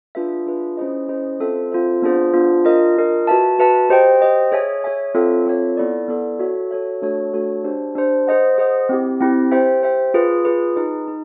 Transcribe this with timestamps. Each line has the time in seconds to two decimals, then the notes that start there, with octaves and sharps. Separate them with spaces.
0.15 D4 F4 G#4 B4 E5
0.46 D4 F4 G#4 B4 E5
0.77 C#4 E4 G#4 C5 D#5
1.09 C#4 E4 G#4 C5 D#5
1.40 C4 F4 A4 C5 E5
1.72 C4 F4 A4 C5 E5
2.02 B3 D4 F4 G#4 C5
2.33 B3 D4 F4 G#4 C5
2.65 D4 F4 A#4 D#5
2.96 D4 F4 A#4 D#5
3.27 F#4 B4 E5 A5
3.58 F#4 B4 E5 A5
3.90 G4 C5 D#5 G5
4.21 G4 C5 D#5 G5
4.52 G#4 C#5 E5 G#5
4.84 G#4 C#5 E5 G#5
5.15 C4 F4 A4 C#5 E5
5.46 C4 F4 A4 C#5 E5
5.77 B3 E4 A4 D5
6.08 B3 E4 A4 D5
6.39 F#4 A4 C#5 E5
6.71 F#4 A4 C#5 E5
7.02 A3 D4 F#4 A4 C#5
7.33 A3 D4 F#4 A4 C#5
7.64 D4 G4 C5
7.95 D4 G4 C5
8.27 G#4 C5 D#5 F#5
8.58 G#4 C5 D#5 F#5
8.89 C4 E4 G4
9.21 C4 E4 G4
9.51 G4 C5 E5 G5
9.83 G4 C5 E5 G5
10.14 F4 G#4 B4
10.45 F4 G#4 B4
10.76 D#4 G#4 B4
11.08 D#4